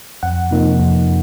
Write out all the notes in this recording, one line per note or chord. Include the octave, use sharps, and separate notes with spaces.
F2 F#5
C3 F3 A#3 D#4
F2